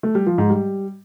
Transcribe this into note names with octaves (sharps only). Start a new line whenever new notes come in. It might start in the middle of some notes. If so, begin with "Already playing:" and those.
A3
G3
F3
G#2
G3